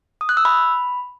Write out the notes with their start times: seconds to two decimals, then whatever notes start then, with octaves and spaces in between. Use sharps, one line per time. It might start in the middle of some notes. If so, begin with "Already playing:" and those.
0.21 D#6
0.29 F#6
0.37 E6
0.45 B5